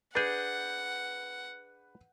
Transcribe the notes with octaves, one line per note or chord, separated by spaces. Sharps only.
D4 G#4 B4 F#5 G6